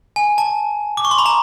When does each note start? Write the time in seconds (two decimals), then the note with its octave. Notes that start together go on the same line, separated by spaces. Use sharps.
0.16 G#5
0.38 A5
0.97 D6
1.05 C#6
1.11 C6
1.18 B5
1.26 A#5